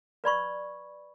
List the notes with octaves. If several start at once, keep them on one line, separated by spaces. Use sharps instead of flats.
B4 D5 B5 C#6